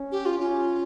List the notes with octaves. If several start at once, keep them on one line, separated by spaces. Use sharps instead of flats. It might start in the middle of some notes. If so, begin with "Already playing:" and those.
Already playing: C#4
G4
F4
C#4 F4